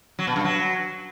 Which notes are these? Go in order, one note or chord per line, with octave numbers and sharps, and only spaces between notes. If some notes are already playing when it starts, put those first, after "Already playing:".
F#3
B2
G2
F#3